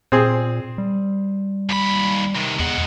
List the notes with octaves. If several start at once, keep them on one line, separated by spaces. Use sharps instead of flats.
A#2 C4 G#4
G3
D#2 B5
C3 D#3
E2 G#3 F#5